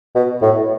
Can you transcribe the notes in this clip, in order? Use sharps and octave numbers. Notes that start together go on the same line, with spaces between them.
B2
A2